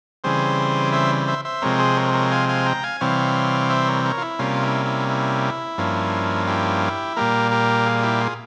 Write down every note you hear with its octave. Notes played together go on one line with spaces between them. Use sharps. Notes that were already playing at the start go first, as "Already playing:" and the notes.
C#3 E3 G3 C4 G#4 C5
C5 E5
C5 E5
C5 E5
C3 F3 G#3 C4 A#4 C#5
G#4 C5
A#4 C#5
A#4 C#5
F5 G#5
F5 G#5
G5 A#5
F5 G#5
C3 E3 G3 C4 C#5 F5
C5 E5
A#4 C#5
A#4 C#5
F4
E4
C3 G3 A#3 C#4 F4
E4
E4
E4
G2 F3 A#3 C#4
E4 G4
A#2 G3 A#3 G4 A#4
G4 A#4
F4 G#4
E4 G4
F4 G#4